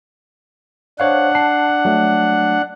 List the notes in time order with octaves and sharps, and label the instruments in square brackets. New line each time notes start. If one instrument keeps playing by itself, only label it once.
[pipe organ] D4 F#5 [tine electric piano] C5 C#5 F5
[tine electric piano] A5 C7
F#3 A3